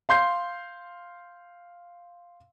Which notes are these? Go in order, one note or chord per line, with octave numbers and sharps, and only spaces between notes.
F5 C6 G6 C7